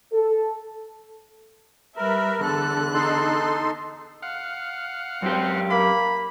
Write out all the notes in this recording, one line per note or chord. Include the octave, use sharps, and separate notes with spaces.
A4
G3 A#4 B4 E5
E2 D3 A4 F#6
D#4 A4 C6
F5 F#5
F#2 C4 G4
A#3 B5